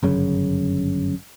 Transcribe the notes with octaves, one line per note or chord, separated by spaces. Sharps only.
G1 F#2 C#3